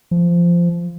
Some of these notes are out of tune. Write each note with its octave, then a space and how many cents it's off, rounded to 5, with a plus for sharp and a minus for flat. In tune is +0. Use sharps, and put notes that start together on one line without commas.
F3 -15